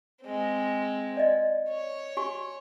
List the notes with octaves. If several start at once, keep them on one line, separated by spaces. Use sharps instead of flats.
G#3 C4
D5 D#5
C#5
F#4 G#5 C#6